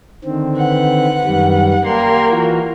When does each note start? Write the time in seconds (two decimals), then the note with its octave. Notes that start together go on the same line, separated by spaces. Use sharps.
0.24 D3 D#3 C4
0.55 B4 F#5
1.24 F#2 D#3 G3
1.85 G3 A#3 C6
2.30 E3 F4 F#4